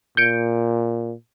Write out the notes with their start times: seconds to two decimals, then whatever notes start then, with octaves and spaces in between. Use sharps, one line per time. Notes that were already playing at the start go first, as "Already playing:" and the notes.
0.17 A#2 G6 C#7 D7